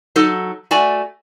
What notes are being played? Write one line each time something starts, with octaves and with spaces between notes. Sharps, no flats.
F#3 D#4 A4
A3 F#4 D5 G#5